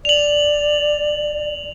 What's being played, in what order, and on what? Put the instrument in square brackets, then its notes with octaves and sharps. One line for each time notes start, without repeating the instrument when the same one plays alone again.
[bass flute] D5 [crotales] F7 F#7